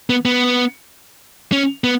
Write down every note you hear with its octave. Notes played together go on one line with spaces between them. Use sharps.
B3
B3
C#4
B3